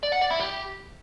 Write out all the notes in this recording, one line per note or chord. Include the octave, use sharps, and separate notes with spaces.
D5
F#5
D5
E4
G4